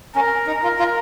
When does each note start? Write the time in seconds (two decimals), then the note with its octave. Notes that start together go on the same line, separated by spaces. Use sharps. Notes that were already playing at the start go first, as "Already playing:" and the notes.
0.15 C#4 A#4
0.47 D#4
0.63 F4 A#4
0.79 F4